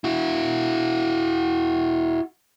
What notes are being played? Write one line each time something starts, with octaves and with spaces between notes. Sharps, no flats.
E4 F#4